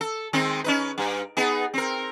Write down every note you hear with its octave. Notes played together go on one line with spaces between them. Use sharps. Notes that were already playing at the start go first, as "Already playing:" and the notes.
A4
D#3 G#3 C4
C#4 D#4 B4
G2
B3 D#4 G#4
C4 A#4